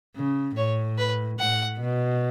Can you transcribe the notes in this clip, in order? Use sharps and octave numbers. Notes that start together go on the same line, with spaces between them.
C#3
A2 C#5
B4
A2 F#5
B2